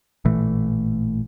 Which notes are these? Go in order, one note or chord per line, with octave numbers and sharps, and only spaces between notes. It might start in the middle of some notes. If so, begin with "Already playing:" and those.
A1 A#2 E3 A3